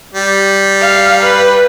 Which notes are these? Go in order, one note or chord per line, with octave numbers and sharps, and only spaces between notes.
G3
F5
B4